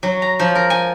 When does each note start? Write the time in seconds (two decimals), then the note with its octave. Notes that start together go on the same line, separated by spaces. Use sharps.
0.03 F#3
0.22 A#5
0.39 F3
0.55 A#4
0.70 G#5